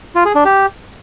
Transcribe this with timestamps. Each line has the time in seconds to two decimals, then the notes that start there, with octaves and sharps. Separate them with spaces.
0.15 F4
0.25 G#4
0.35 D4
0.45 G4